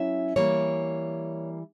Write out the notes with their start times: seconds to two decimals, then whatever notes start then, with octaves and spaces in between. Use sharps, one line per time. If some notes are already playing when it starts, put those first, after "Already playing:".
Already playing: F#3 C#4 E4 E5
0.36 E3 G3 A#3 C#5